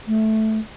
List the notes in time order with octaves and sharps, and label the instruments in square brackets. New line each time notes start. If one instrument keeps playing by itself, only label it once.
[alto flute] A3